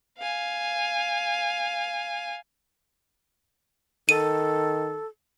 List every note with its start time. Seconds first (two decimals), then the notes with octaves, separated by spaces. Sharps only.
0.19 F5 G#5
4.09 D#3 A4 D#7